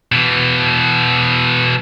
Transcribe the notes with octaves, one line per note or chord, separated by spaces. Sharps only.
B2 E3